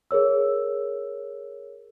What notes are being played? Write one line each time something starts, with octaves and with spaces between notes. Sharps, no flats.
G#4 A#4 C#5 E6